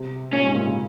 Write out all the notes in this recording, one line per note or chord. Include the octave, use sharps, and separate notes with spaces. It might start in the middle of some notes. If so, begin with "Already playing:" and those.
Already playing: C3
A#2 C#4
G#2
A#2
C#3